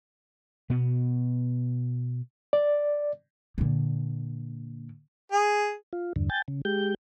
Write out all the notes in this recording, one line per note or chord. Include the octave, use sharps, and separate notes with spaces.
B2 B3
D5
A#2 D3
G#4
F4
E2 G2 D3
G5 G#5 G6 A6
C#3
G#3 G4 G6